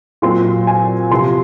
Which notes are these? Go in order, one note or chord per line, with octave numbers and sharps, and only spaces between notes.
A#2 F#3 C4 C6
G#5
C3 F3 C4 C6